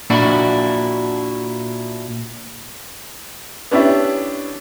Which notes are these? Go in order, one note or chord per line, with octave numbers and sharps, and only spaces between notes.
A#2 D4 E4 F#4
B3 C#4 D4 E4 G4 E5